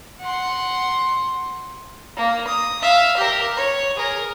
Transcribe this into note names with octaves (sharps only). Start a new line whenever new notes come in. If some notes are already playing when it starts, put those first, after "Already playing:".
F#5 C6
A#3
D#6
E5 F5
G4 A#4
C#5
G#4 A#4